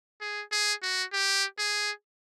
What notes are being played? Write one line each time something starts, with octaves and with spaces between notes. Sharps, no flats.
G#4
G#4
F#4
G4
G#4